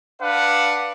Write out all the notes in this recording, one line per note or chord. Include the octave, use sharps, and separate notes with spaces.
D4 B4 F5 F#5